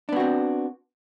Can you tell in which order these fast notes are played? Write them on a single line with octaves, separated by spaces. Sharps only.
D4 B3 F#4 C4